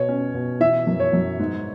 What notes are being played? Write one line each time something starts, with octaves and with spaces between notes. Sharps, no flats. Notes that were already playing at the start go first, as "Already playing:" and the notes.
Already playing: B2 C#5
C#4
B2
E3 E5
F#2
C#5
F#2
G#2